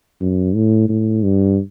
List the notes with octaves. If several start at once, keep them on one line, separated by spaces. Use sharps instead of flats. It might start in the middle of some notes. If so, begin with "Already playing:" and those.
F#2
A2
A2
G2